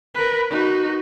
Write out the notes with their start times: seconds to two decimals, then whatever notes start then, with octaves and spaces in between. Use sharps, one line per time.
0.15 A#4 B4
0.50 D#4 F#4